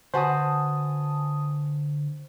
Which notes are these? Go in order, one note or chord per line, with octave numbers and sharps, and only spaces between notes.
D3 F#4 B4 C5 G#5 A5 D#6